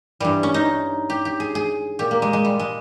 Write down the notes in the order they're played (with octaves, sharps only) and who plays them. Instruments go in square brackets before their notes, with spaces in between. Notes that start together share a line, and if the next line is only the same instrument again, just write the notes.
[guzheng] G2 E3 G3
C#4
D#4
G4
G4
G#4
G#4
A#2 G4
A#3
G#3
G#3
G3
G#3